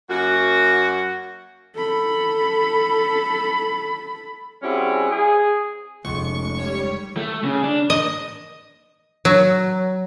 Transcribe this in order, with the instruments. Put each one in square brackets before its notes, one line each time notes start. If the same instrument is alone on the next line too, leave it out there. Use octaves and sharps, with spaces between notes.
[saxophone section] F#2 A#3 F#4
[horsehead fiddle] A4 B5
[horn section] G3 C4 C#4 E4 F#4 G#4
G#4
[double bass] F1 [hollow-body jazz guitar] C#2 [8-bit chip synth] C#6
[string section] G3 C#5
[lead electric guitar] A3
C#3
D4
[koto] D#5
F#3